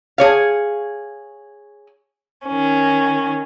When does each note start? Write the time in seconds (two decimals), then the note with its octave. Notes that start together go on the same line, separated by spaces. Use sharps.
0.18 G#4 C#5 F5
2.47 D#3 C#4